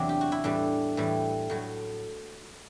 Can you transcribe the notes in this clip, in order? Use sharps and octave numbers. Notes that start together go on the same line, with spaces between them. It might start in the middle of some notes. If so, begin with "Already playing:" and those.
Already playing: E2 C3 F#3 C4 D4
G4
F#4
E4
A2 E3 G3 D4
A2 E3 G3
A2 F#3